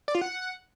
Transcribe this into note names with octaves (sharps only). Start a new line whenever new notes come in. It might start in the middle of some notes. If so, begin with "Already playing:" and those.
D5
F4
F#5